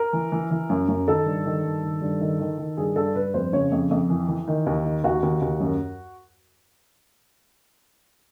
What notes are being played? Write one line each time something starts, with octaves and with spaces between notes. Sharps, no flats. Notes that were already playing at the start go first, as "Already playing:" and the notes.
Already playing: A#4
E3
E3
E3
F#2
F#2
D#3 A4
G2
D#3
G2
D#3
G2
D#3
D#3
D#3
G2 G#4
G2 A4
G2 B4
F2 C5
C#3 C#5
F2
F2
E3
E3
D#3
D#2
D#3
D#2 F#4
D#2
D#2
F#2